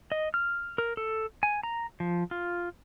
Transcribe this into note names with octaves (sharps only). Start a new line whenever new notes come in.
D#5
F6
A#4
A4
G#5
A#5
F3
F4